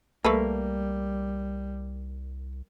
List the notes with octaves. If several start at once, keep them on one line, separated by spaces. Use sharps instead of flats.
C2 G3 A3 A#3 A4 B4